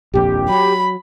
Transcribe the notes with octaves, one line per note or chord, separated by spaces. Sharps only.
D#1 A#1 F2 G4
F#3 B5